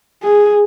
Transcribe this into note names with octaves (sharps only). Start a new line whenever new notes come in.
G#4